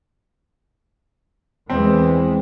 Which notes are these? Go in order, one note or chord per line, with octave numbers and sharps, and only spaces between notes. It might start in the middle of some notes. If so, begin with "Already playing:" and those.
E2 E3 G#3 C4